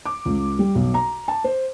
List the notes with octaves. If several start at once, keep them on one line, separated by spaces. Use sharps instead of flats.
D6
C#2
G3
B1
A#5
A5
C5